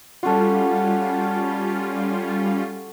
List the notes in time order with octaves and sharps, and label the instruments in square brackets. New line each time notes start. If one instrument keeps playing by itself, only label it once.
[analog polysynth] G3 C#4 F4 [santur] F#4 A4